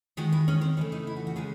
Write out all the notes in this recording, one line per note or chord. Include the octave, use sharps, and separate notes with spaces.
D#3 G#3 F#4
E4
C#4
C4
C#3 E3 A3 C#4
D#4
E4
F#4
F#4
C#3 G#3 G#4